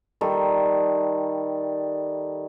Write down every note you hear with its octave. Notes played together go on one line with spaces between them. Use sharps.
D#3 G3 A4